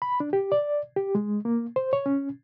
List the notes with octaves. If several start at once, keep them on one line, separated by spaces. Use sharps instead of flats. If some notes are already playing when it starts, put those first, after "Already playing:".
B5
D4
G4
D5
G4
G#3
A#3
C5
C#5
C#4